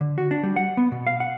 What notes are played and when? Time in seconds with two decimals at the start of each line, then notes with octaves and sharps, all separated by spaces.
0.01 D3
0.18 F#4
0.31 D4
0.43 G3
0.56 F#5
0.77 B3
0.92 B2
1.07 F5
1.20 F#5